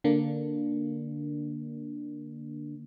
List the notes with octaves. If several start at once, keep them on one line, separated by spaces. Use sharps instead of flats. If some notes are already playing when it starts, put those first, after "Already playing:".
D3 A#3 D4